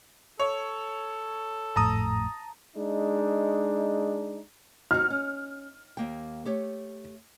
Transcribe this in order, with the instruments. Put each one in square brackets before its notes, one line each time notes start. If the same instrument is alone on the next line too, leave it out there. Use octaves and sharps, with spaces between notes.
[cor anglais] A4 [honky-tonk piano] C#5
[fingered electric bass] G#1 F2 A2 [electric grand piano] A5 A#5 D#6
[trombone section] G#3 D4 D#4
[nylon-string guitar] C4 D#4 F#4 [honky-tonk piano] F6
[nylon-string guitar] C#4
D#2 A#3 G5
A3 G4 C#5